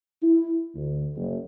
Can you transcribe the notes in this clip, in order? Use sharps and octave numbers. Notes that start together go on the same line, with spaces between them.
E4
D2
F#1